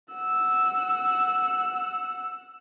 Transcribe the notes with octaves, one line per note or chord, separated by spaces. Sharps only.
F#5 E6